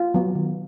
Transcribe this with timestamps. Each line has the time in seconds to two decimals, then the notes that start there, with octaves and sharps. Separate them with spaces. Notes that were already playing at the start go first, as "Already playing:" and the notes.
Already playing: F4
0.14 F#3 B3
0.35 D#3